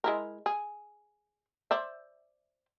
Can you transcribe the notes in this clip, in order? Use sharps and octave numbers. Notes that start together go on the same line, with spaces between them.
G#3 E4 A#4
G#4
C5 D5 E5